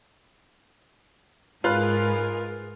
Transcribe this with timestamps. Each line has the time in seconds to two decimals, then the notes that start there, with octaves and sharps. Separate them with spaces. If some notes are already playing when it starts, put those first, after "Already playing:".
1.64 G#2 F4 G#4 A#4 B4 F#6